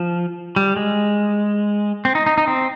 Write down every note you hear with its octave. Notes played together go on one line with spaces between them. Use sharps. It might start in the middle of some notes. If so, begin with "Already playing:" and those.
Already playing: F3
G3
G#3
C4
D#4
D#4
D#4
C4